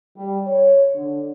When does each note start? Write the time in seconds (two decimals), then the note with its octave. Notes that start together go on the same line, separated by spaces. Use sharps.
0.17 G3
0.47 C#5
0.94 D3